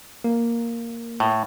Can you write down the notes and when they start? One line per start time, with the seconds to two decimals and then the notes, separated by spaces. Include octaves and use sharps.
0.24 A#3
1.20 A2